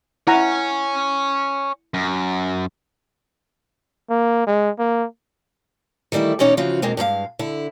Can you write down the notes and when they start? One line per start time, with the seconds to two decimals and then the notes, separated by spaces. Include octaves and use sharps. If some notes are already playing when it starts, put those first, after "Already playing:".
0.27 E4 C#5 F#5 G#5 A#5
1.94 F#2
4.10 A#3
4.47 G#3
4.79 A#3
6.12 D#3 E3 G3 A3 E4
6.39 B2 E3 C#4 D#4 C#5 D5
6.57 C#3 E3 F3 F4 F#4
6.82 E2 B2 G#3 A#3 C4
6.97 G2 G#3 A4 F5
7.39 D3 E4